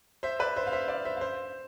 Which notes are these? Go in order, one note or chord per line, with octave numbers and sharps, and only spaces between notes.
C5 E5
B4 D5
C5 E5
F5
C5 E5
D5 F5
C5 E5
F5
C5 E5